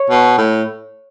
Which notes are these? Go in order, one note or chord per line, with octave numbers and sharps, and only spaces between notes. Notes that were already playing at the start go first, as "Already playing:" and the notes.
Already playing: C#5
B2
A2